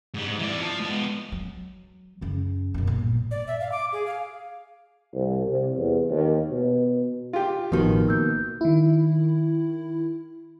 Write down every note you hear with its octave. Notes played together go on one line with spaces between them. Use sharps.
G#2 G3
G#2
E3 D5
F4 A5
G#3 B3
F#3
F#2 C#3
B1 F#2
G1 A#2
D5
E5
F5
D6
G#4
F5
C2
C3
E2
D#2
B2
F4 G4 F5
A1 B2 D#3 F3 F#4
A#3 E6 G6
D#3 E4